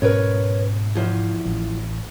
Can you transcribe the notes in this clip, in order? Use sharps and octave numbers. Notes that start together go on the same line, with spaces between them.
G#2 B2 C#4 A#4 B4 C#5
E2 F3
A1